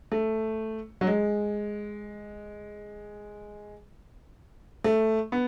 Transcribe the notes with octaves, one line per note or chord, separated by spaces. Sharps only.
A3
F#3
G#3
A3
B3